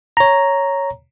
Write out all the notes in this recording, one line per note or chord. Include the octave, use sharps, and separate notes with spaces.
C#5 A#5